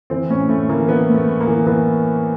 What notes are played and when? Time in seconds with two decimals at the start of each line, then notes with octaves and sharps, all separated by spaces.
0.10 E3 C4
0.29 A2 C#4
0.49 A2 A3
0.69 E3 A#3
0.89 E3 B3
1.09 A2
1.14 A3
1.28 A2
1.41 A#3
1.47 E3
1.66 E3 B3